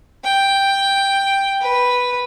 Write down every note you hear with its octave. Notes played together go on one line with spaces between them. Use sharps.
G5
B4